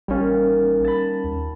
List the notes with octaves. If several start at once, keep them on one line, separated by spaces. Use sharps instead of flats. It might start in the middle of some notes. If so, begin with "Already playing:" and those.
A1 A#2 D#3 G3 C#4
A5 B5
D#2